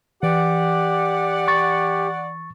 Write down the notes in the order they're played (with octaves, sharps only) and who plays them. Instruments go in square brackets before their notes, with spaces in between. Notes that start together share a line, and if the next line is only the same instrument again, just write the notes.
[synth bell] E3 [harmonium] G4 [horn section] D5 F#5
[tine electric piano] C#6 A6